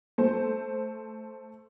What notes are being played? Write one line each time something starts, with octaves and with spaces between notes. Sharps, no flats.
A3 C5